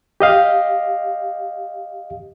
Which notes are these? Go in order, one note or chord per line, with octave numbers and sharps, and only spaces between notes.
G4 D#5 F5